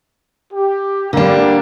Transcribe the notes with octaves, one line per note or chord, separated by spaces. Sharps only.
G4
D3 G3 A#3 D4